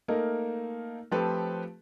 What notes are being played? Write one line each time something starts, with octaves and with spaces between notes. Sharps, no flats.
A3 A#3 D#4 A#4
F3 A3 C4 G4 A4 B4